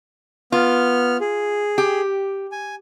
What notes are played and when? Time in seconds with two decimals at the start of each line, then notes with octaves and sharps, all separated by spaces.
0.52 B3 F4 F6
1.21 G#4
1.78 G4
2.52 G#5